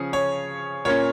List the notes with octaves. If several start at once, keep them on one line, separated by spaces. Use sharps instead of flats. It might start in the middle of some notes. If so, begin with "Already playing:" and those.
Already playing: C#3 F3 C#4 G#4
C#5
A#2 A#3 C#4 C#5